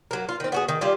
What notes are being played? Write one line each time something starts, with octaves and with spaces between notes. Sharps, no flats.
F#3 A#3
F4
D#3 C4
B3 F#4 G#4
D#3
G3 C#4 F4 D5